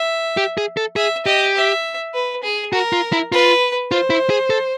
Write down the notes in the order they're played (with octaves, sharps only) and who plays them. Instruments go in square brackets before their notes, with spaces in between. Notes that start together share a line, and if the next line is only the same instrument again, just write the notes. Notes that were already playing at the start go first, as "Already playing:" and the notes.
Already playing: [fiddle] E5
[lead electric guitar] G4
G#4
A4
[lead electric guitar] G#4 [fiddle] E5
[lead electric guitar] G4 [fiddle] D#5
[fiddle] E5
B4
G#4
[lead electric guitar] F#4 [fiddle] A#4
[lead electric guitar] F4
E4
[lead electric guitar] F4 [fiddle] B4
[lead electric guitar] F4 [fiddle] C5
[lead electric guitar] E4
G#4
A4